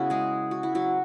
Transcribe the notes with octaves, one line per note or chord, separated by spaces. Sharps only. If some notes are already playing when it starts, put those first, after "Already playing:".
Already playing: C#3 B3 C#4 E4 F#4
G#3 G#4
F#4
E4
F#3 F#4